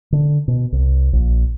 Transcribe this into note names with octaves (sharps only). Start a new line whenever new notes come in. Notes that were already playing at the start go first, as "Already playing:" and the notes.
D3
B2
C2
A#1